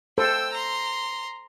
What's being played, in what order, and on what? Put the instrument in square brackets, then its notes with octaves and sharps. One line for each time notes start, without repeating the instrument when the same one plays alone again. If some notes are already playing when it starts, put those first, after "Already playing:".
[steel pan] A4 C5 [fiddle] G5 E6
[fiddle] A#5 C6